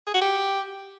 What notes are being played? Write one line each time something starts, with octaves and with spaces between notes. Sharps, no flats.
G#4
F#4
G4